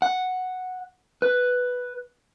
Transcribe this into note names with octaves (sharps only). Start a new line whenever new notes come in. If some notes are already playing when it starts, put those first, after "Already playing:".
F#5
B4